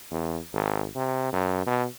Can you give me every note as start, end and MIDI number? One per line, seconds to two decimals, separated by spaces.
0.11 0.39 40
0.54 0.86 32
0.96 1.30 48
1.33 1.64 42
1.67 1.86 47